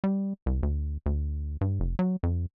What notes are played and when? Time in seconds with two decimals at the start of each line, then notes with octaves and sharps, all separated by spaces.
0.04 G3
0.46 C2
0.63 D2
1.06 D2
1.61 G2
1.80 F1
1.99 F#3
2.23 F2